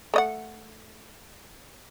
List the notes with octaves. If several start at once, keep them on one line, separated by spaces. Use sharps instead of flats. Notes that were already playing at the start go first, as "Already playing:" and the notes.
A3 D#5 F#5